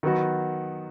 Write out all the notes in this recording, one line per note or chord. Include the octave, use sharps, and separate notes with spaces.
D#3 F#3 B3 F#4